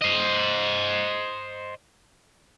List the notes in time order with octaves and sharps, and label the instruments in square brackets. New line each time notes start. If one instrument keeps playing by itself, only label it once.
[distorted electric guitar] C5 D#5